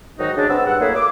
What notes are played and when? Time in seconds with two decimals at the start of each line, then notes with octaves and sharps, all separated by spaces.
0.19 G#2 D#3 F#3 D#4 F#4
0.37 C#3 F#3 G#3 D4
0.49 C4 B4 F#5 E6
0.66 G2 F#5
0.80 F#3 A3 A#3 E4 G#4 C#5
0.95 D6